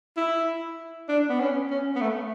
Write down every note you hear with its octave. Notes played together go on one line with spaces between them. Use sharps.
E4
D4
B3
C#4
C#4
B3
A3